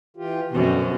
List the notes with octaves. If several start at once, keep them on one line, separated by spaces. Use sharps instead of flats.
E3 F4 G4
F#2 B2 D3 C4